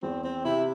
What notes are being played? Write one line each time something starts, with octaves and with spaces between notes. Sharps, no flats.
E2 C4
C4
C3 E4